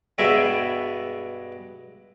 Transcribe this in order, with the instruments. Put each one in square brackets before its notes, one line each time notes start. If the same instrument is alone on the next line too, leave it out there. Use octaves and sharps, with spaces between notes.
[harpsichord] G2 B2 G#3 G#4 E5